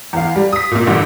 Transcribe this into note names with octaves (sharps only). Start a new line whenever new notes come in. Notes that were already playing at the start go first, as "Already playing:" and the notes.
E2 F5
G3
D#6 B6
A#2 A#3
A1 G2 D3